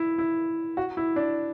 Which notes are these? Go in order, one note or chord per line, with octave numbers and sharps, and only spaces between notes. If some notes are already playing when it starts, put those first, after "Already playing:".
Already playing: E4
E4
F#4
E4
D4